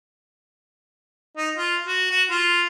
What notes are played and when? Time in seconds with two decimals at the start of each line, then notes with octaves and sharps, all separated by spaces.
1.37 D#4
1.56 F4
1.87 F#4
2.10 F#4
2.30 F4